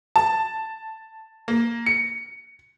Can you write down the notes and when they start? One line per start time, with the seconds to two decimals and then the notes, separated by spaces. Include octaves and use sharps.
0.16 A5
1.48 A#3
1.86 C#7